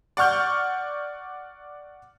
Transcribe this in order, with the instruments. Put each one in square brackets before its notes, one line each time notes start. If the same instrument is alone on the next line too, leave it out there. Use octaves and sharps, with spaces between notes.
[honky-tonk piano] D5 F#5 C#6 F6 G6